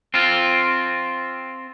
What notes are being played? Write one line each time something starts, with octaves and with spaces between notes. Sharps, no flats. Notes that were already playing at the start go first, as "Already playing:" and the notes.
C4 F4